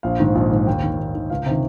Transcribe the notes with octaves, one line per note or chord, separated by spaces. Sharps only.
A#1 F5
G#2 D#3
A#1
G#2 D#3
D#2 G5
D#3
D#2
D#3
C#2 F5
C3 D#3